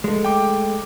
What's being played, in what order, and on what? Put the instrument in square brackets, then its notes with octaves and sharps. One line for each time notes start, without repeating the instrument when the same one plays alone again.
[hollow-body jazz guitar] G#3 A3
[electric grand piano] G5 D6